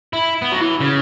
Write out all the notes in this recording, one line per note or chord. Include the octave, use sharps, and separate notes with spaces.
E4
B3
F#3
E3
C#3